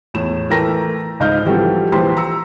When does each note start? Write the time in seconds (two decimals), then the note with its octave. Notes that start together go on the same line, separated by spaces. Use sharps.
0.14 E2 A2 E7
0.50 E3 A3 A#4 G5 A#5 A#6
1.20 C#2 G#2 D#5 F5 F6 G6
1.45 E3 F3 G3 C4 F#4 A4
1.92 A#1 E3 F4 G4 C5 C6
2.17 A#5 E6 C#7